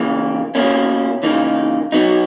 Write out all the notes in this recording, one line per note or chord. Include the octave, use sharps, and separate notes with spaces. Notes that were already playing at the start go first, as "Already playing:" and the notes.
Already playing: E2 C#3 E3 A#3
B2 A#3 C#4 E4
C#3 E3 A#3 D#4
B2 F#3 B3 D#4